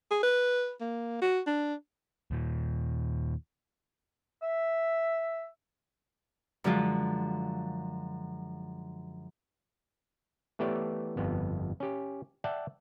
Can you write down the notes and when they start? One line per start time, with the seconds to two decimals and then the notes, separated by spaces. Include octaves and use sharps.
0.11 G#4
0.23 B4
0.81 A#3
1.22 F#4
1.46 D4
2.31 D#2 A#2
4.42 E5
6.64 F#2 D3 F3 G#3 F4
10.59 E3 A3 B3 G4 C#5 D5
11.17 G1 F2 B3
11.80 C#4 G4
12.44 D5 E5 F#5 G5 A5